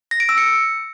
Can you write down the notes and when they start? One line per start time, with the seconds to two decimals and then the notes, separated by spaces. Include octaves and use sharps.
0.11 A#6
0.20 D7
0.29 E6
0.38 C#7